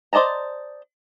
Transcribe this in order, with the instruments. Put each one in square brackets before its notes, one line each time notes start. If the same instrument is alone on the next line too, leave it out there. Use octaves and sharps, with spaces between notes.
[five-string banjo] C5 D5 D#5 A5 A#5